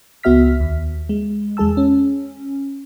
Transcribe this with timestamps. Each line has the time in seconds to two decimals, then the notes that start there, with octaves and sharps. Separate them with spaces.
0.23 C#2 B3 F#4 E5 F6 B6
0.60 D#2
1.09 G#3
1.57 E2 G#3 G#4 A5 E6
1.77 C#4